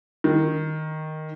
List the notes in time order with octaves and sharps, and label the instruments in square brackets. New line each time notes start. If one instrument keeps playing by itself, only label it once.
[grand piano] D#3